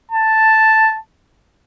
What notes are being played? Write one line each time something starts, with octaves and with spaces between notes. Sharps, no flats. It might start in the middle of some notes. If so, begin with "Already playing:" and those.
A5